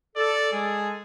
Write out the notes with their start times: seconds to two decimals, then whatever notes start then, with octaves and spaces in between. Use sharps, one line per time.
0.16 A4 D5
0.52 G#3 G#4 A4